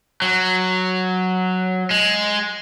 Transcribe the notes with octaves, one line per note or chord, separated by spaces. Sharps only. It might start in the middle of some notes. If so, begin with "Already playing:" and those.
F#3
G#3